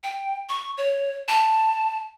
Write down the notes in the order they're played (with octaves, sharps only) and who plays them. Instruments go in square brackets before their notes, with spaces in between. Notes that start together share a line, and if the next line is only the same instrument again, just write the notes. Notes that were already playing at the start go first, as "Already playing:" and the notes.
[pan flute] G5
C#6
C#5
A5